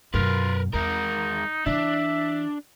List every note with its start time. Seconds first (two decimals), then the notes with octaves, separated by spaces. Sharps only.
0.14 F#2 B2 F4 A#4 B4
0.74 E2 G#3 D#4 A#4
1.66 E3 D4 E4 E5